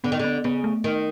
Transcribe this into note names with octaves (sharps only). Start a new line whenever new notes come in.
D3 B3
D#3
D3 B3
C#3 B3
A3
D#3